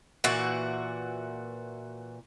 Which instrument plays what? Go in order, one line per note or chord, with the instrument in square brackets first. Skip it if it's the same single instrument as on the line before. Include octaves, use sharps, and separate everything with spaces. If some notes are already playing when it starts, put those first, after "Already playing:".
[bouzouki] A#2 E3 F#4